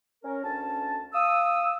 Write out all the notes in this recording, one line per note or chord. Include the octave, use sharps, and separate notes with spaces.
C#4 A#4
D2 C#4 A5
F5 D#6 E6